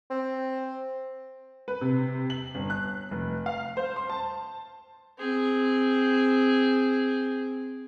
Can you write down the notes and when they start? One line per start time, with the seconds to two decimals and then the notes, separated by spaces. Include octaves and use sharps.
0.10 C4
1.68 B4
1.81 C3
2.30 F#7
2.55 G1
2.70 F#6
3.11 F1
3.46 F5
3.77 C5
3.96 C6
4.10 A5
5.18 C4 G#4